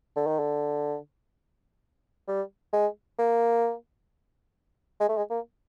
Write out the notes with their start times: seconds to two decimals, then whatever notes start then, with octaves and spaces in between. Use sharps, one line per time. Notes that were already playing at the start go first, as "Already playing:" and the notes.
0.16 D3
0.27 D#3
0.39 D3
2.28 G3
2.73 G#3
3.19 A#3
5.00 G#3
5.08 A3
5.17 G#3
5.30 A#3